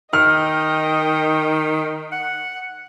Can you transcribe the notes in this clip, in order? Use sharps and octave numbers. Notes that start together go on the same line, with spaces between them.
D#3 D#5 G5 F6
F#5